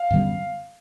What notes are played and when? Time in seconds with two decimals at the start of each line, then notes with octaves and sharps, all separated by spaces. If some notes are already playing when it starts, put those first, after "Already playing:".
Already playing: F5
0.10 F#2 D3 G3 B3